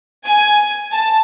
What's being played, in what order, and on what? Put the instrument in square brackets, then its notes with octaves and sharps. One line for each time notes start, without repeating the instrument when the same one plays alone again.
[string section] G#5
A5